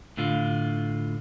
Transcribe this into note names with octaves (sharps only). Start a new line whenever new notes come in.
A2 D3 F4